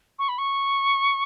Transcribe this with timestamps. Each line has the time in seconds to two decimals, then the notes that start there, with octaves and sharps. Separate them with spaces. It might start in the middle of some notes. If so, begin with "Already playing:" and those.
0.19 C#6
0.29 B5
0.38 C#6